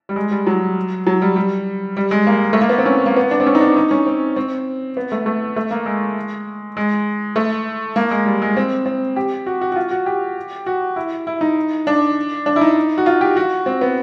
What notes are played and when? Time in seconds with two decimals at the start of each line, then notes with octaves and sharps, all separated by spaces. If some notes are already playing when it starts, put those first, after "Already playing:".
0.09 G3
0.16 G#3
0.31 G3
0.47 F#3
1.07 F#3
1.22 G3
1.36 G3
1.97 G3
2.11 G#3
2.27 A#3
2.53 A3
2.61 A#3
2.69 B3
2.78 C4
2.86 C#4
3.06 A#3
3.16 B3
3.31 D4
3.40 C4
3.47 C#4
3.55 D#4
3.61 D4
3.76 D#4
3.91 C#4
4.06 C4
4.36 C4
4.97 B3
5.12 A3
5.26 A3
5.56 A3
5.71 A#3
5.86 G#3
6.77 G#3
7.36 A3
7.96 A#3
8.11 G#3
8.26 G3
8.42 G#3
8.57 C4
8.86 C4
9.16 G4
9.46 F#4
9.61 F#4
9.72 F#4
9.76 F4
9.91 F#4
10.06 G4
10.66 F#4
10.96 E4
11.27 E4
11.41 D#4
11.87 D4
12.46 D4
12.56 E4
12.61 D#4
12.98 F#4
13.06 F4
13.21 G4
13.36 F#4
13.66 C4
13.81 B3